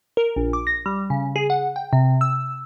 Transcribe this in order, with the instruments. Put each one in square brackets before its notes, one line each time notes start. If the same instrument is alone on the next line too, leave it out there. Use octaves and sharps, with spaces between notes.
[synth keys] A#4
A#1
D6
A#6
G3
C#3
G#4
F#5
G5
C3
E6